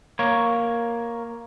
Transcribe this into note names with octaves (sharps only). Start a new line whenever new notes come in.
A#3 C#5